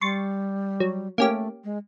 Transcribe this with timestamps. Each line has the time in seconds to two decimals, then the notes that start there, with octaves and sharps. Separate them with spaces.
0.01 G3 C6 C#6 A6
0.80 F#3
1.18 A3 A#3 C#4 G4
1.64 G#3